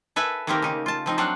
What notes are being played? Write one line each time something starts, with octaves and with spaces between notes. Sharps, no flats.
A4 B4 E5 G#5
D#3 A3 A#3 C4 G4 A#4
C#3 D#4
F4 A5
F3 C4 D#4
F#3 C4 D4 F5 F#5